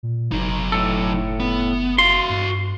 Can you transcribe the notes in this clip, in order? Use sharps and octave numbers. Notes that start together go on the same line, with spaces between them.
A#2
F#1 F#3 D#4
A2 A4
B3
F#4 F5 C6
G2